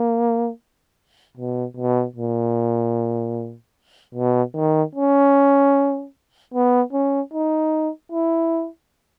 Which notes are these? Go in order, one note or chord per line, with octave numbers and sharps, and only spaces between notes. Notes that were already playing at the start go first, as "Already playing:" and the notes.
Already playing: A#3
B2
B2
A#2
B2
D#3
C#4
B3
C#4
D#4
E4